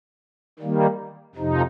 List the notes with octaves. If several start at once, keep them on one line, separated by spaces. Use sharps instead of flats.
D#3 G3 A#3
F2 C3 F3 D#4